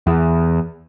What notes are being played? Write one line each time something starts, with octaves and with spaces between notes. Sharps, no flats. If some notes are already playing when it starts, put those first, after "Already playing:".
E2